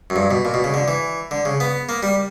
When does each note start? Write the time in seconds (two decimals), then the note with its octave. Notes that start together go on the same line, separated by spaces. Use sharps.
0.10 F#2
0.16 G2
0.31 B2
0.45 A#2
0.54 B2
0.64 C#3
0.74 D3
0.88 E3
1.31 D3
1.45 C#3
1.60 B3
1.89 A#3
2.03 G3